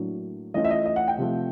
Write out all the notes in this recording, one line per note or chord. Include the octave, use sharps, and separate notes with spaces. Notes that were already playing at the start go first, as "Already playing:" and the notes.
Already playing: A2 F#3 A#3 D4
E3 A3 C#4 F4 D#5
E5
D#5
D#5
F#5
G5
C3 F3 A3